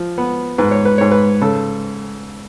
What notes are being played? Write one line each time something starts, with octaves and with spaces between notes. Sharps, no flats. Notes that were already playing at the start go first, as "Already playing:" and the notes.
Already playing: F3
B3
G#2 B4
C#5
B4
G#2 C#5
B4
C#3 A4